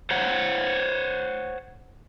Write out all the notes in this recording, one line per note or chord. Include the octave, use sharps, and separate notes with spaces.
C5 C#5 F#5